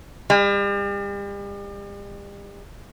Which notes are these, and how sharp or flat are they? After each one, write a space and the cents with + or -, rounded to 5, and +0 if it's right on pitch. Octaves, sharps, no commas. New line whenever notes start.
G3 +40